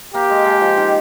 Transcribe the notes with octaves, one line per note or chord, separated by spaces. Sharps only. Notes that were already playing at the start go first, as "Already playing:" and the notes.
A#3 G4
G#3
G#3
F3
D#3